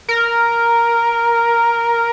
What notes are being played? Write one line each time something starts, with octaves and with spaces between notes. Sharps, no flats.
A#4